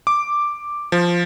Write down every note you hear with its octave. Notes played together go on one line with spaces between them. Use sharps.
D6
F3